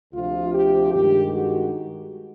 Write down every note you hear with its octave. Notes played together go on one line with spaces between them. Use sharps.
D2 C3 F3 F4
G4
G2 D#3 G#3 G4
F#4